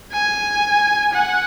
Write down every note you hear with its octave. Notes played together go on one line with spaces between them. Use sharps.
G#5
F#5